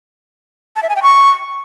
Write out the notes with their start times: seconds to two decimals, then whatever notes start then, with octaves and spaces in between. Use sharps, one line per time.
0.76 A5
0.83 E5
0.89 G#5
0.96 G5
1.03 C#6